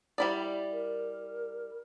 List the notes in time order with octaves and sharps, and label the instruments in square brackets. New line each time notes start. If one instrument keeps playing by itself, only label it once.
[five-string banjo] G3 E4 D5
[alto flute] A#4